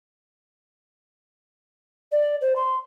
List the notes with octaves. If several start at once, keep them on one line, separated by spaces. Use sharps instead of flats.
D5
C5
C6